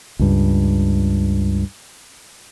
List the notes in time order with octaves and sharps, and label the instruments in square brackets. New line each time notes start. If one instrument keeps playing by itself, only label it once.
[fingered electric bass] C#2 G2